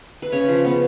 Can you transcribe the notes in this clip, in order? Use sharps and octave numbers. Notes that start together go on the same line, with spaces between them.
B4
C#3 C#5
F3
B3